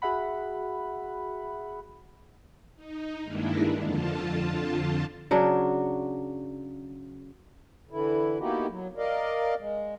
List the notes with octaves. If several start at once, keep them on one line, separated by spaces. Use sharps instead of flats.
F#4 G#4 E5 F#5 B5
D#4
G2 D#3 G#3 A#3 D4 E4
F2 D3 F4 A5
C#3 F#3 D4
D3 E3 E4
A#3 B3 D#4 E4 F#4 G4
F#3
A#4 D5 D#5 F5
G#3